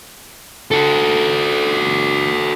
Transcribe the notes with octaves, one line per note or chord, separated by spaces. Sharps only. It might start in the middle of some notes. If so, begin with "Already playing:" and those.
F#4 A4